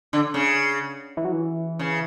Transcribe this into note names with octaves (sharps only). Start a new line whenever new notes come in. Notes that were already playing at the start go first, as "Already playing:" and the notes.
D3
C#3
E3
F#3
E3
C#3